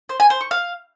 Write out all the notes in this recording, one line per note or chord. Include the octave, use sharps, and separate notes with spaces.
C5
G#5
C5
C#6
F5